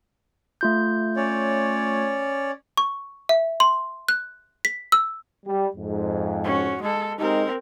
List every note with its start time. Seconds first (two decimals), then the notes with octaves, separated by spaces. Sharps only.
0.61 A3 F4 G6
1.16 C#4 C#5 D5
2.77 C#6
3.29 E5
3.60 C6
4.09 F#6
4.65 B6
4.92 E6
5.46 G3
5.77 F2 G#2
6.44 C#4 F#4
6.82 G#3 A4
7.19 G#3 C4 D#4 G4 A#4